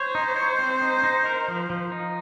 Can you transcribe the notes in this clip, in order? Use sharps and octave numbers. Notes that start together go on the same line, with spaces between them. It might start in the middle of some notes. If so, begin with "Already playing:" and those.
Already playing: C5 C#5
D#4
C#5
C4
D#4
D#4
A#4
F3
F3
D#4